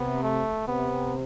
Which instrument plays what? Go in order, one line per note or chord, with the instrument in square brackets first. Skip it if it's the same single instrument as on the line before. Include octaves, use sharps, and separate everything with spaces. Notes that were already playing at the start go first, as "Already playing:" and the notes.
Already playing: [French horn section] C3 [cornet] B3
[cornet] A3
[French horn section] C3 [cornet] B3